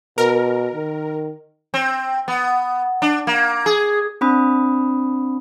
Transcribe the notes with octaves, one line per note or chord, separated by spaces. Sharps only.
B2 A#4
D#3
C4
B3
D4
A#3
G#4
C4 D4 B5 D#6